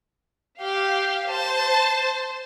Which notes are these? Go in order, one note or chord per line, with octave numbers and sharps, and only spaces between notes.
G4 F5
C5 A5